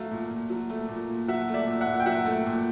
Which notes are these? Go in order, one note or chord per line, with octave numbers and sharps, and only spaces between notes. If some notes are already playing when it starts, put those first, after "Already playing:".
Already playing: F#3 A3 F5
A#2
A#2
F#3
A3
A#2
A#2
F#3 E5 F#5
A3
D5 E5
A#2
E5 F#5
A#2
G5
F#3 E5 F#5
A3
A#2